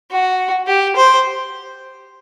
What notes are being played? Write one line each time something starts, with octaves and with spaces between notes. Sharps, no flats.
F#4
G4
C5